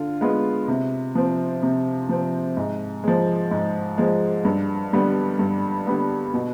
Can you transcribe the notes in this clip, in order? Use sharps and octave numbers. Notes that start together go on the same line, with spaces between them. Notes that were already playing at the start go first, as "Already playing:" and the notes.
Already playing: D3 F4
G#3 B3 F4
C3
F3 C4
C3
F3 C4
G#2
F3 G#3
G#2
F3 G#3
G2
D3 G3 B3
G2
D3 G3 B3
B2